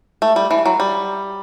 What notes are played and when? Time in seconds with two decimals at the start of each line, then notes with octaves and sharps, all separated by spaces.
0.22 A3
0.36 G3
0.51 E3
0.66 F#3
0.80 G3